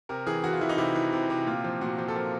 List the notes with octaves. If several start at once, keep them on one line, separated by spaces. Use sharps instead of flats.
C3 A#4
E3 G#4
E3 F#4
F4
E3 E4
D#4
C3 E4
E3
C3
C3
A#2 F4
F3
A#2 F#4
F3
A4
F3 A#4